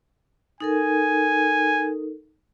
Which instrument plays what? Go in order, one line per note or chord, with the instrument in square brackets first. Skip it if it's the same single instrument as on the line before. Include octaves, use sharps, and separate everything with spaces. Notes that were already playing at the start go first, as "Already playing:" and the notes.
[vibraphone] D#4 A4 A#4 [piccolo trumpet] G#5